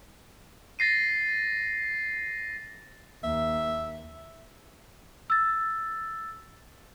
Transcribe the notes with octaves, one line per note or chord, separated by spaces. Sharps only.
A6 A#6 C7 D#7
D#2 A#3 E5
E6 A6